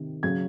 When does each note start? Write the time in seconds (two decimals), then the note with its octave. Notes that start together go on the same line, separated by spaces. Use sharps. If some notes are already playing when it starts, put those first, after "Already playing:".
Already playing: C3 D#3
0.23 C#3 F#3 G#6